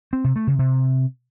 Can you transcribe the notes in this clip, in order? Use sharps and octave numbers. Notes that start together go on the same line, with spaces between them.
C4
C3
A3
C#3
C3